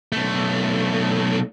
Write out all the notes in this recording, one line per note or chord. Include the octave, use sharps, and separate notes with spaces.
B1 A3